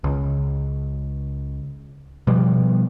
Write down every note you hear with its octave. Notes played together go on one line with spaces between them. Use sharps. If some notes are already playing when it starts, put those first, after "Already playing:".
C#2
B2 F3 G3